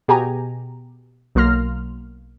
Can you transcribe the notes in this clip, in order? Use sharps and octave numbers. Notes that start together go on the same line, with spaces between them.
B2 G4 G#4 G#5 A#5
B1 F#3 A#3 C6 F6 A#6